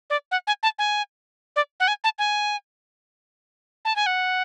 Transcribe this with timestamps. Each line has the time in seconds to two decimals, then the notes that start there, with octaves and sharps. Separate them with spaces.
0.10 D5
0.31 F#5
0.47 G#5
0.63 A5
0.79 G#5
1.56 D5
1.80 F#5
1.88 G#5
2.04 A5
2.19 G#5
3.85 A5
3.96 G#5
4.06 F#5